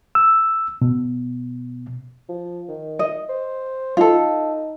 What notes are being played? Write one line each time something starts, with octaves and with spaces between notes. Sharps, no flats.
E6
B2
F3
D#3
D#5
C5
D#4 F4 A4